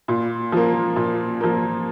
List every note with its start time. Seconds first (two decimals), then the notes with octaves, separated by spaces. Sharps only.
0.08 A#2
0.52 F3 A#3
0.96 A#2
1.41 F3 A#3